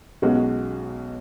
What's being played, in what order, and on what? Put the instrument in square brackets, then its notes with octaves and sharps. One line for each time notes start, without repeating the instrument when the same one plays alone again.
[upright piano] B1 B2 G#3 C#4 F#4